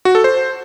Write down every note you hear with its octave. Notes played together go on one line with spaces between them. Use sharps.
F#4
A4
C5